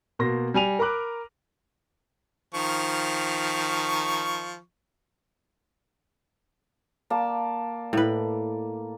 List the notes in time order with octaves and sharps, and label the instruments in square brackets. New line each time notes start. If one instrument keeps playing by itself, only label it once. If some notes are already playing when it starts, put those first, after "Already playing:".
[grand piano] B2 A#3 C6 A#6
G3 G#5 D#7 F7
A#4 A#5 B5 D6 F#6
[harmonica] D#3 F3 C#6
[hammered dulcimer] A#3 D5 A5
[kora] A2 B4